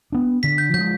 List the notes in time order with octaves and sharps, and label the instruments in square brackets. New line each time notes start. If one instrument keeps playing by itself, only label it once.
[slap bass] B3 D4
[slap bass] D3 [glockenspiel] B6
[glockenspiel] G6
[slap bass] F3 G#3 [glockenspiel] G6